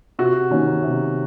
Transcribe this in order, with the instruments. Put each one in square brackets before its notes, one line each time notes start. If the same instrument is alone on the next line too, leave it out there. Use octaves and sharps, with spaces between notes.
[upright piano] C3 F#4
D#3 A#3 C#4
C3